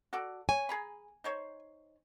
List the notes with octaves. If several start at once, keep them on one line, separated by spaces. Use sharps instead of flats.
F#4 A4 D5
C#5 G#5
G#4 A#5 B5
D#4 C5 C#5